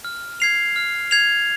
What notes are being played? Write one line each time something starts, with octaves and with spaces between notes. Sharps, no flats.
F6
G#6 C7 F7
F6
G#6 C7 F7